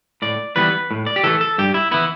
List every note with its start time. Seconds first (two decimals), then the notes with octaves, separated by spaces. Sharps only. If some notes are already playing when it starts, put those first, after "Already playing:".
0.22 A2 D5
0.56 E3 G3 B3 B4
0.91 A2
1.06 D5
1.16 G4
1.24 E3 A3 A4
1.41 A4
1.58 G2 G4
1.74 E4
1.91 E3 B3 E4